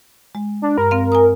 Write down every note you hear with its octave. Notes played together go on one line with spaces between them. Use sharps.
G#3
D4
G2 A#4
C4 F5
G#5 A#5 D#6